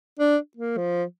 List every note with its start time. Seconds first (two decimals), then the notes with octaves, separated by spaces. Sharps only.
0.19 D4
0.57 A#3
0.78 F3